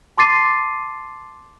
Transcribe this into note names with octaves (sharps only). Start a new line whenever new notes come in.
A5 C6 D6 A6 C7 D#7